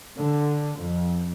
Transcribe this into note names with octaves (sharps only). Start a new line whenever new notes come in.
D3
F2